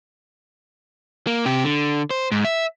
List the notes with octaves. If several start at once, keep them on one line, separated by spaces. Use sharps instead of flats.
A#3
C3 G4
D3
C5
G#2
E5